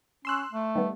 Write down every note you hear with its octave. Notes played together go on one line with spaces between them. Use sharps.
C#4 C6 E6 F#6
A3
D#3 G3 B3